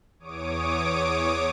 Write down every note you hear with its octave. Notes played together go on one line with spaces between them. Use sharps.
E2 C#5 D6 D#6 D7